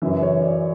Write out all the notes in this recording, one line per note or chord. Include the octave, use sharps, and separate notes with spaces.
F#2 C#3 E3 E5
C#5
D5